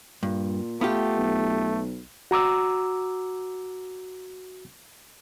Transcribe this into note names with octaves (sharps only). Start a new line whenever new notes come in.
G2 A#2
A3 B3 F4 G4
B1
F#4 A#5 D6 E6